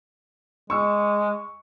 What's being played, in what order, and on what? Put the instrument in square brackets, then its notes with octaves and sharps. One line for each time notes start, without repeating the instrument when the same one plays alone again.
[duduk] G#3 [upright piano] C#6 E6